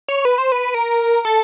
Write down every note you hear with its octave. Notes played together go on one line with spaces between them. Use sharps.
C#5
B4
C5
B4
A#4
A4